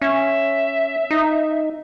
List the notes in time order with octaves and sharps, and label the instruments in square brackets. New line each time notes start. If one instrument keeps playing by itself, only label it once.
[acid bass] C#4 [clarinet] E5
[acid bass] D#4